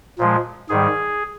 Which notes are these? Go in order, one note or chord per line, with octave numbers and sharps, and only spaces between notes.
A#2 F3 G#3
G#2 D#3 G3 G#4